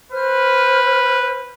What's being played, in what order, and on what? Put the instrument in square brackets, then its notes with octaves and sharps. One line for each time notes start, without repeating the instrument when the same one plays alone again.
[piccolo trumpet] B4 [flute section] C5 F6